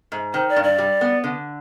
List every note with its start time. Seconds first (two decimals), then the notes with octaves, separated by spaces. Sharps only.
0.12 G#2
0.34 D#3 C5
0.49 D5
0.56 G2
0.64 D5
0.78 G3
1.01 B3
1.24 D3